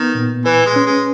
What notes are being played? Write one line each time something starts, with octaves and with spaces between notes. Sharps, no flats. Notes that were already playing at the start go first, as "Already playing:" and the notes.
Already playing: D#3 B3
A#2
E3 B4
G#3
C#4
G#3